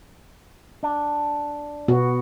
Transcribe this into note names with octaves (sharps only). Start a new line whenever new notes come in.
D4
B2 B3 F#4